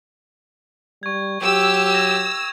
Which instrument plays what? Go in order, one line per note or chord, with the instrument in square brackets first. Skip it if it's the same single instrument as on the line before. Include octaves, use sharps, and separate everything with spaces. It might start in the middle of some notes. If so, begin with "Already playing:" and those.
[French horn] G3 [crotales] C#6 G#6
[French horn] F#3 [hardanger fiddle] G4 [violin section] E6
[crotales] G#6 A#6 F7